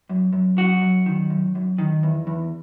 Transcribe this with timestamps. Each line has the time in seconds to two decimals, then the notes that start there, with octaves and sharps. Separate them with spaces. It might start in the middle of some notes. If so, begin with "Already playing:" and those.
0.09 F#2
0.33 F#2
0.57 F#3 F#4
0.82 F#2
1.06 D#3
1.30 F#2
1.55 F#2
1.78 D#3
2.03 E2
2.27 E2